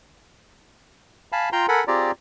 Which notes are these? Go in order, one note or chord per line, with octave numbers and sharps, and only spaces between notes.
F5 G#5 A5 B5
F4 G5 A#5 C6
A4 A#4 F#5 G#5 B5
C4 F4 G4 G#4 D5 A#5